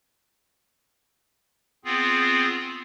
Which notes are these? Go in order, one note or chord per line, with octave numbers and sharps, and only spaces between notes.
B3 C4 F4 G#4